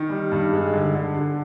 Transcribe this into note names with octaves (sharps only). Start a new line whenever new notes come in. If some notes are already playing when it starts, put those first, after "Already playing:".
Already playing: D#3
G3
G2
G#3
D3
D3
D3